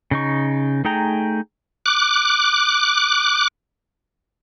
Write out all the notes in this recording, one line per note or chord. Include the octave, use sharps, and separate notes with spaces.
C#3 D#4 C#6
A3 D#4 G#4 G5 A#5
D6 F#6